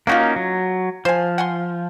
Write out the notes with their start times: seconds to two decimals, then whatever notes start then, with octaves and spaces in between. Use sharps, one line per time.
0.07 A#3 C#4 D#4 F4 F#4 F#5
0.36 F#3
1.05 F3 C5 G#5
1.38 F#5 G#5 C6